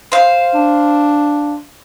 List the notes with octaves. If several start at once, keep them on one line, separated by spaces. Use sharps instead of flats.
C5 F5
D4